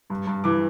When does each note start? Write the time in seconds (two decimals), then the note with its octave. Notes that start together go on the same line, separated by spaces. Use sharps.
0.10 G2
0.27 G2
0.44 E3 D6